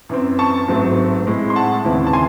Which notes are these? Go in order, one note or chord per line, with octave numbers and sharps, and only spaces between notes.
F#2 E3 C4
A5 C#6
A1 G#2 F#3 A3 C4
A2 G#3 C4 E4
C6
F#5 A5
D#2 C#3 E3 C4 E4
A5
G#5 C6